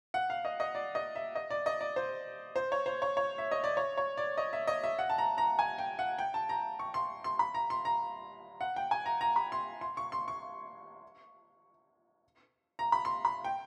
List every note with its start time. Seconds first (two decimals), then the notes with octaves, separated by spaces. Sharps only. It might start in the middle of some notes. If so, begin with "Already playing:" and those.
0.14 F#5
0.30 F5
0.45 D#5
0.60 D#5
0.75 D5
0.95 D#5
1.15 E5
1.35 D#5
1.50 D5
1.66 D#5
1.81 D5
1.96 C5
2.56 C5
2.72 C#5
2.86 C5
3.02 C#5
3.17 C#5
3.38 E5
3.52 D#5
3.64 D5
3.77 C#5
3.97 C#5
4.17 D5
4.38 D#5
4.53 E5
4.67 D#5
4.84 E5
4.99 F#5
5.10 A5
5.18 A#5
5.38 A#5
5.59 G#5
5.78 G5
5.99 F#5
6.19 G5
6.34 A5
6.49 A#5
6.79 C#6
6.94 C6
7.24 C6
7.39 B5
7.54 A#5
7.70 C6
7.85 A#5
8.61 F#5
8.76 G5
8.91 G#5
9.06 A#5
9.21 A#5
9.36 B5
9.52 C6
9.81 C6
9.97 C#6
10.12 C6
10.28 C#6
12.79 A#5
12.92 B5
13.05 C6
13.25 B5
13.44 G5